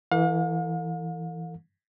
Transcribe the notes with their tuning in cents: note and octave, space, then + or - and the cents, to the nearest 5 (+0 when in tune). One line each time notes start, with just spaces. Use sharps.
E3 +0 A4 +40 F5 +45